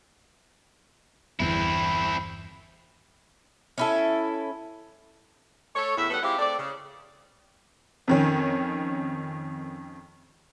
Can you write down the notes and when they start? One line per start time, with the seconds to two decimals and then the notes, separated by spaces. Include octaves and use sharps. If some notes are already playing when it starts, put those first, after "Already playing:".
1.40 G1 E2 D3 C4 E4
3.78 C#4 E4 A4
5.75 A3 A4 C#5
5.97 E2 A2 E4 E5
6.10 A2 G3 B3 A4 F#5
6.23 G#3 C4 E4 F4 G4
6.39 A3 C4 D5
6.59 C#3
8.08 F2 D#3 C#4